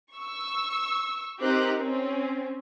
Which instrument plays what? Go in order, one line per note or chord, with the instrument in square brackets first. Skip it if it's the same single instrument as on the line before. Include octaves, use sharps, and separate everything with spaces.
[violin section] C#6 E6
C4 D#4 G4 A#4 F#6
C4 C#4